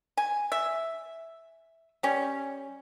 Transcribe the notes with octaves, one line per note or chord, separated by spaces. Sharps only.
G#5
E5
G3 C#4